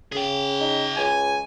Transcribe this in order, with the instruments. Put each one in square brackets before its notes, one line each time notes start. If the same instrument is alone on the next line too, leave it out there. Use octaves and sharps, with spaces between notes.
[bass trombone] C#3 [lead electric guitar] G#4 G5
[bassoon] D#4
[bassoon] C#2 [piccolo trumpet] G#5